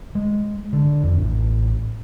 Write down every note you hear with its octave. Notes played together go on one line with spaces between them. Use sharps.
G#3
D3
F2
A1